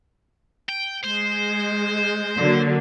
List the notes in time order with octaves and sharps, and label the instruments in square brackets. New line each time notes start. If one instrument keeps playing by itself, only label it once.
[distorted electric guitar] G5
[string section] G#3 [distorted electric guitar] C5
[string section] D3 F#3 A#3